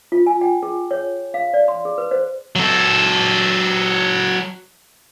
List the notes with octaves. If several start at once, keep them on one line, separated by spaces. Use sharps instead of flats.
F4
G#5
G5
G#4
C#5
F5
D5
C6
G#4
B4
C5
F#3 A4